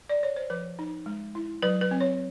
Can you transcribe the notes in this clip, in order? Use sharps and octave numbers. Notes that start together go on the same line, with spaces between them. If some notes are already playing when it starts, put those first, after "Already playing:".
D5
C#5
C5
F3 B4
D#4
G#3
E4
F#3 B4
B4
C4
C#5